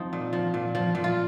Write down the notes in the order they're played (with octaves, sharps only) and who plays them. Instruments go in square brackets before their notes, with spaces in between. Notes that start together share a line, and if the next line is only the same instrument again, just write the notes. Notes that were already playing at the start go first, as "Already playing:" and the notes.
Already playing: [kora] F3 C4 D#4
A#2
F3
A#2
F3
A#2
F4